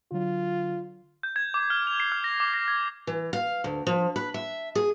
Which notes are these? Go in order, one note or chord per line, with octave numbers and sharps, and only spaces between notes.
D3 F#3 F4
G6
G#6
D6
F6
F7
C7
F6
A#6
D6
A#6
G#6
E3
F5
D2
F3
B4
E5
G#4